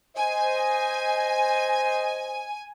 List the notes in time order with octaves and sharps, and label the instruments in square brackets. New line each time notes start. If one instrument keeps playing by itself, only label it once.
[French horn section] C5 D#5 [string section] G#5